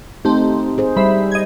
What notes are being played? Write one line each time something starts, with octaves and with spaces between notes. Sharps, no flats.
A3 C4 D#4 G4
G#4 C5
G3 C5 E5 B5
D#5 G#6